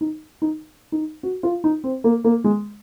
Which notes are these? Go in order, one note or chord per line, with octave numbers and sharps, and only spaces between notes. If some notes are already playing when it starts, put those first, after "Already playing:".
D#4
D#4
D#4
F#4
F4
D#4
C4
A#3
A#3
G#3